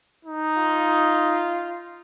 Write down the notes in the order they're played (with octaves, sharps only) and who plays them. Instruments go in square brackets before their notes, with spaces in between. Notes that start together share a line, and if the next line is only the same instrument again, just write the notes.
[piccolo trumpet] D#4
[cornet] F4